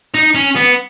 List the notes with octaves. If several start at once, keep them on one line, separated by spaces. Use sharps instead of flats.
D#4
C#4
B3